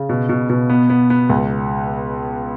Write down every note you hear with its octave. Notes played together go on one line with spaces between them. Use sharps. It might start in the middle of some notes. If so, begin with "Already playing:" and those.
Already playing: C#3
B2
B2
B2
B3
B3
B3
C#2